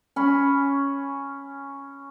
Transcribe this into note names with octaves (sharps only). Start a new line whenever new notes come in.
C#4 B5